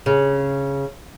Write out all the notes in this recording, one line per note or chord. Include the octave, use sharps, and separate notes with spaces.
C#3